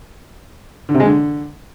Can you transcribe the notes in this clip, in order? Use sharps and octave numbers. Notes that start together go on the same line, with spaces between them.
D3
C3
G#3
D3